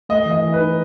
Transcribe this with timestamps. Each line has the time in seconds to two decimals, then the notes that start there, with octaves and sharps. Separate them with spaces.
0.09 A3 D#5
0.26 E3
0.31 D#5
0.43 E3
0.54 B4
0.59 D#4